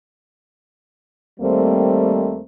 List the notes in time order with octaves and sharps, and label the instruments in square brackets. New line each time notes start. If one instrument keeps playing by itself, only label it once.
[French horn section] D#2 G3 A3 A#3 C4